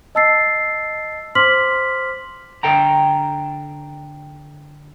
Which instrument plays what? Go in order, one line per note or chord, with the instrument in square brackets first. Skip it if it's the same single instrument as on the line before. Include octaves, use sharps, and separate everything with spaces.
[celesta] D#5 A5 E6 A6 C7
C5 C6 D6 F6 B6 F#7
[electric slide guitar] D3 A4 G5 A#5